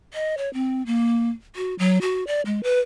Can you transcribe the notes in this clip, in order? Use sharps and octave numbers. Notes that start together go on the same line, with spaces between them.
D#5
C#5
C4
A#3
F#4
F#3
F#4
D5
G#3
B4